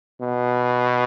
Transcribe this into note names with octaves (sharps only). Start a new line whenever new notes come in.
B2